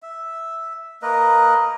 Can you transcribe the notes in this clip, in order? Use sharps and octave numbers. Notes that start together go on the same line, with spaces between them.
E5
A#3 A#4 B4 D#5